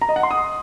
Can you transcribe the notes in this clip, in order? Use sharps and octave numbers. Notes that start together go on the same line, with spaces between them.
A#5
D#5
F#5
C6
D#6